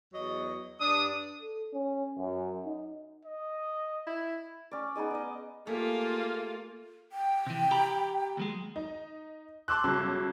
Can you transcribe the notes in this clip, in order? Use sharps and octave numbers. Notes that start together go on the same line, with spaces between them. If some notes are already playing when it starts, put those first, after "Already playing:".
E2 F#3 D#5
G2 D4 D#6
A4
C#4
F#2
D#4
D#5
E4
C#4 D5
B3 D#4 G#4 D#5
D5 D#5
A3 A#3 F4 G4 G#4
G5
C3 E3
G4 A#5 B5
D#2 F#3 G#3
D#4
A5 C6 D6 E6 F#6
G1 C#3 F#3 A5